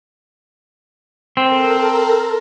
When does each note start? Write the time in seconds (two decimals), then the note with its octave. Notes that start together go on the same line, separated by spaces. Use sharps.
1.37 C4 A4 A#4